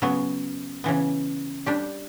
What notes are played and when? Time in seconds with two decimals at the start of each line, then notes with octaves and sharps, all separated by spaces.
0.02 C#3 F#3 B3
0.84 C#3 E3 B3
1.66 G3 D4 G4